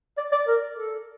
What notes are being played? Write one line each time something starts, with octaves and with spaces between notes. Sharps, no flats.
D5
D5
A#4
A4